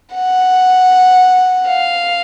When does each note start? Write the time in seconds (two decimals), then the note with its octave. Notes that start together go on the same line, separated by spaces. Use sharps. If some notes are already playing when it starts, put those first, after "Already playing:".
0.13 F#5
1.68 F5